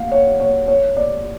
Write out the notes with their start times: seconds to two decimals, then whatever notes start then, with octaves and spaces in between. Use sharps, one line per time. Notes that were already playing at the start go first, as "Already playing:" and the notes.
Already playing: F5 F#5
0.11 C#5
0.40 C#5
0.68 C#5
0.97 D5